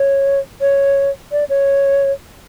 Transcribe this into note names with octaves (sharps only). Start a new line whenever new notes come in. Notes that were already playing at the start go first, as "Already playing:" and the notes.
Already playing: C#5
C#5
D5
C#5